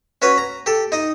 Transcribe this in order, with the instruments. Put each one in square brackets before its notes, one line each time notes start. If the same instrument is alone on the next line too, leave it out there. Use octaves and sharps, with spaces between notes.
[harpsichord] C#4 F#4 B4 C#5
A#5
G4 A4
D#4 D#5